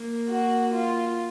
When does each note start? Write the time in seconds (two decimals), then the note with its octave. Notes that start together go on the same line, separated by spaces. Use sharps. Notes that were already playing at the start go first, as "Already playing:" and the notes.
Already playing: A#3
0.28 F#4
0.74 F4